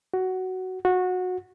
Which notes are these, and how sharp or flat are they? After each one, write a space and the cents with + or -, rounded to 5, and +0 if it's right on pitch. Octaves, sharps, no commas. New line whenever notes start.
F#4 +10
F#4 -20